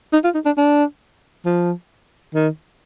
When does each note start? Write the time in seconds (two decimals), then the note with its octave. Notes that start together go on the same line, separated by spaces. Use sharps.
0.13 D#4
0.24 F4
0.34 D#4
0.46 D4
0.57 D4
1.45 F3
2.35 D#3